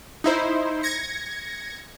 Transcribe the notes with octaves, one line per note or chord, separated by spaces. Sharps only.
D#4 E4 C5
G#6 A#6 C#7